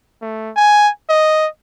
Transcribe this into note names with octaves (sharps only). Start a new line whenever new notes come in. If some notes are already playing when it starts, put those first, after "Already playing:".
A3
G#5
D#5